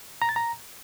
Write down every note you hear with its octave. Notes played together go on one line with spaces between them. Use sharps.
A#5
A6
A#5